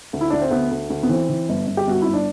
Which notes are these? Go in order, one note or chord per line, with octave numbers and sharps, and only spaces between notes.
D2
E4
D2 D4
C4
D2 B3
D2
D2
B3
E3 C4
E3
G1
G1
G4
G1 F#4
G1 E4
D4